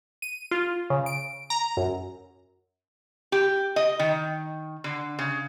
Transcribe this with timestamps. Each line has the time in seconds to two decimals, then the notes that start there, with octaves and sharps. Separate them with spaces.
0.22 D#7
0.51 F4
0.90 C#3
1.06 D7
1.50 A#5
1.77 F#2
3.32 G4
3.76 D#5
3.99 D#3
4.84 D3
5.19 C#3